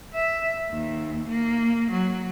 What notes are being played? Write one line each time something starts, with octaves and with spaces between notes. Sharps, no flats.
E5
D#2
A#3
F#3